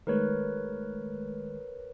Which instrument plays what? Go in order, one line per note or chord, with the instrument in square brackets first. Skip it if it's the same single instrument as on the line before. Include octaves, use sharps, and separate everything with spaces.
[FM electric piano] D#3 G#3 A3 [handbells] A#4 B4 C#5